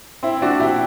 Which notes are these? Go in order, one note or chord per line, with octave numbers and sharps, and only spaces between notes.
C4 E4
D4 F#4
E4 G4